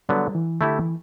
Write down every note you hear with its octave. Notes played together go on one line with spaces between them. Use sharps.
D3 F#3 G3 B3
E3
D3 A3 E4 G4
E3